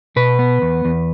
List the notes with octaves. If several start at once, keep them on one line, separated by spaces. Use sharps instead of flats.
B2 B4
B3
E2
E2